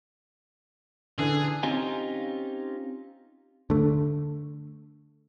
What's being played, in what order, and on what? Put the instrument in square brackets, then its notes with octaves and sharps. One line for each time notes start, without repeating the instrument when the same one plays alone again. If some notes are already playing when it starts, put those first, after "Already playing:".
[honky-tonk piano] D3 E3 [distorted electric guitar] G#4
[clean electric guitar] C4 C#4 D#4 F4 G4 G#5
[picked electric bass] D3 A3